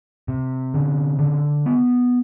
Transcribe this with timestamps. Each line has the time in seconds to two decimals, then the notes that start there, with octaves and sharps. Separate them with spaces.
0.28 C3
0.74 D3
1.19 D3
1.66 B3